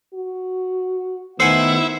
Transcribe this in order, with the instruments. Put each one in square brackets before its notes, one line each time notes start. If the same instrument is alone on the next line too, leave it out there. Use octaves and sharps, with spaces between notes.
[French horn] F#4
[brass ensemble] D#3 A3 B3 [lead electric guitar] E4 [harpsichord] C5 F#5 G#5